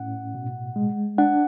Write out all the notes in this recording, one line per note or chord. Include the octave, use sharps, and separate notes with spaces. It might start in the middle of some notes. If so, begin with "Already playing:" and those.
Already playing: A2 C#4 F#5
B2
G#3
D4 F#5